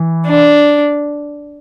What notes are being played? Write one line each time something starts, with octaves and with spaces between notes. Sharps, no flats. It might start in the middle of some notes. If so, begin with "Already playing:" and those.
Already playing: E3
D4